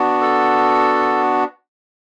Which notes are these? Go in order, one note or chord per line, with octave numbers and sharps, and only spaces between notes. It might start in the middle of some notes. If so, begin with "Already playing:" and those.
Already playing: B3 D4 F#4
A4